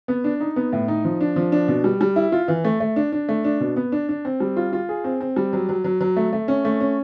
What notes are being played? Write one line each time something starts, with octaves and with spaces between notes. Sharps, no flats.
B3
D4
D#4
B3
A2
D#4
F3
D4
F3
D4
B2
G3
G3
E4
F4
E3
A3
A3
D4
D4
A3
D4
B2
B3
D4
D4
C4
G3
F4
F4
G#4
C4
C4
G3
F#3
F#3
F#3
F#3
A3
A3
C#4
A3
C#4